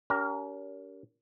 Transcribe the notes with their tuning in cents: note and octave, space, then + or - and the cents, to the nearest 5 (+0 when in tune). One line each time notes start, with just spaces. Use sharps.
C#4 +45 G4 -20 A#4 +0